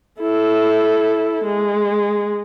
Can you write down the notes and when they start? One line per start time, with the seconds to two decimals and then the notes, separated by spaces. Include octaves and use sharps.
0.20 E4 A4
1.45 G#3